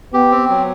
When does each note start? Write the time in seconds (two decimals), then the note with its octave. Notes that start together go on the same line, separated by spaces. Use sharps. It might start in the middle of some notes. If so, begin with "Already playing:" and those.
0.13 B3 G4
0.31 C4
0.50 F#3